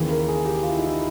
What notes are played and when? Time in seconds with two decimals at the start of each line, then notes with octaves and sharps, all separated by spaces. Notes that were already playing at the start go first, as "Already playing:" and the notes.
Already playing: D#2 C#3 E3
0.10 A#4
0.28 G#4
0.45 G4
0.63 F4
0.69 E4
0.78 D#4
0.85 E4